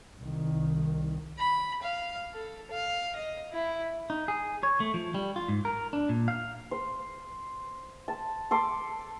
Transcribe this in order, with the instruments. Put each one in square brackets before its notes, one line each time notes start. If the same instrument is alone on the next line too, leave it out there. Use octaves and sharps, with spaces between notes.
[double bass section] C2 D#3
[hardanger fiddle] B5
F5
A4
F5
D#5
E4
[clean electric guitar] D#4
G#4
C#5
A3
F3
G3
F4
G#2
A#4
D4
A#2
F5
[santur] C5
A5
A4 C6 D6